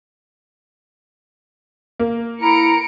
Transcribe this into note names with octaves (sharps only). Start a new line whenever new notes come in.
A#3
E4 A#4 A#5 C#7 D7